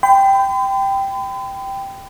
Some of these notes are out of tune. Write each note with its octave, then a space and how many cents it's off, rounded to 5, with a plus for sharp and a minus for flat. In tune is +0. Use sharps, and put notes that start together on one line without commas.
G5 +0 B5 +45